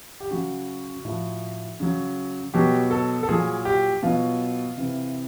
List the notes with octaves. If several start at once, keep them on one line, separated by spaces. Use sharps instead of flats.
G4
C#3 F#3 F#4
A2 F3
C#3 F#3
B2 F#3 G4
A4
A4
A#2 F#3 G#4
G4
B2 F#3 F4
C3 E3